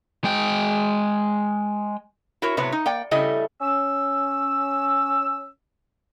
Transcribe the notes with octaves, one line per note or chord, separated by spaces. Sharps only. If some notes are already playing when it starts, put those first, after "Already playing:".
G#3 G5
E4 F#4 A#4 C#5
A2 C3 F#3 B3 B4 C#5
D#4
A#3 D5 G5
C#3 G3 A3 E4 D#5
C#4 E6